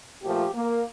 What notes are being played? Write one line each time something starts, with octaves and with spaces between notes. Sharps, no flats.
A#2 F3 A3 G4
A#3